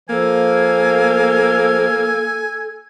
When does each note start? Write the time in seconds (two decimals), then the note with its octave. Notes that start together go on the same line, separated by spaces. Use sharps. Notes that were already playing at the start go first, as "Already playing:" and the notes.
0.09 F3 A#3 A4 G#5